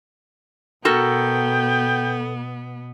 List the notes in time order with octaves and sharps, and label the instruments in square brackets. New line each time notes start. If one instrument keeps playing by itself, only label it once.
[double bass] B2 [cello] B3 [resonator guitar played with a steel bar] F#4 A4 A#4 [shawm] G5